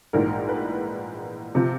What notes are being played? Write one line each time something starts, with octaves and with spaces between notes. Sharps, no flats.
A#1 G#2 E3 A#4
B4
C3 F3